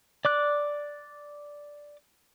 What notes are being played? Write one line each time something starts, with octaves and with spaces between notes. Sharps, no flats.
D5 D6 F#6